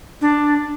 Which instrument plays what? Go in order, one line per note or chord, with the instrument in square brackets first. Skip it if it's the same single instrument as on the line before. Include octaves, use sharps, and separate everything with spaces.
[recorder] D4